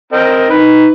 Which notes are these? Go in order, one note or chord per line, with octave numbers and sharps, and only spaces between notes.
C4 A#4 D#5
D#4 B4